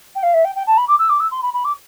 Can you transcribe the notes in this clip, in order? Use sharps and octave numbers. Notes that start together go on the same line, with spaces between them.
G5
F5
E5
G5
G5
A5
B5
D6
E6
D6
E6
C6
B5
B5
D6